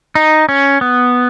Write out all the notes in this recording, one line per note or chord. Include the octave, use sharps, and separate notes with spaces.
D#4
C#4
B3